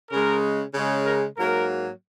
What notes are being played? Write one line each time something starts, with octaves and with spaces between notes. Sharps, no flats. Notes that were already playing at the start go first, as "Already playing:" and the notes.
C#3 G#3 A#4
C#3 G#3
A#4
G#2 F#3 A#3 A#4